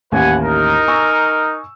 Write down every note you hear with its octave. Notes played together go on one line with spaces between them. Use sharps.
A1 D#2 B4 F#5 G#5
D#4 A#4
G#5 C#6 E6